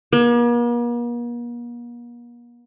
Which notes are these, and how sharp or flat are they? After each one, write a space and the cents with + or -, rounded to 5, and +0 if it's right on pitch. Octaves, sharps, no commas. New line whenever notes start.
A#3 +45